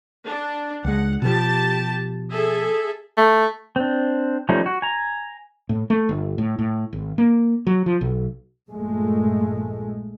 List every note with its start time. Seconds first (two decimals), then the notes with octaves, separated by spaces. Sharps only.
0.25 D4
0.84 C#2 G#3 F#5
1.22 B2 F3 G4 A5
2.31 G#4 A4 E5
3.17 A3
3.76 C4 D4
4.49 F3 G3 A3 C#4 D#4
4.66 F#4
4.82 G#5 A#5
5.69 A2
5.90 A3
6.09 G1
6.38 A2
6.59 A2
6.93 G#1
7.18 A#3
7.67 F#3
7.86 F3
8.01 B1
8.68 A#1 G2 A#2 G#3 A3